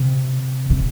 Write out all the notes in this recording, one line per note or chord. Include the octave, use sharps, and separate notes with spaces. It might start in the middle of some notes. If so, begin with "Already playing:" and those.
Already playing: C3
C3